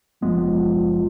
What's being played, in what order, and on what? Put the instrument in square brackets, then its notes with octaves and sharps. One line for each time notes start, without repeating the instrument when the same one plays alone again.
[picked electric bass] F#1 G#3 B3 [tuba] F3